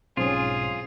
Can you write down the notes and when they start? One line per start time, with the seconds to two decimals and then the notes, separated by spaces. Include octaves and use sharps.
0.17 B1 G#2 C4 C#4 F4 G#4